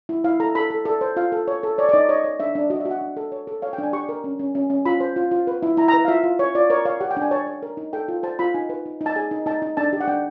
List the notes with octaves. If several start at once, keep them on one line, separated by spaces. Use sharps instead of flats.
E4
E4 F5
A4 A#5
A4 B5
A4
A4
C5
F4 F5
A4
C#5
A4
C#5 D5
D5
D#4 D#5
C#5 D#5
C#5
D4 E5
D4
F#4 D#5
E5
F#4
F#5
D4
A4
C#5
A4
C#5 F5
G5
D4 G#5
G4 C#6
A#4
C#4
C#4
C#4
C#4
F4 B5
C5
F4
F4
B4
E4
E4 A#5
A#5
B4
F5
F4 E5
F4
C#5
F4 D5
A#4 C#5
C#5 F5
G4 F#5
G5
D4 G#5
C#5 A5
C#5
A#4
D#4
A4 G5
F4
C5 A5
F4 B5
D#4 G#5
B4
D#4
D#4
A5
G#4 G#5
D#4
D#4 A5
D#4
D4 A5
G4
F#5
D4 G5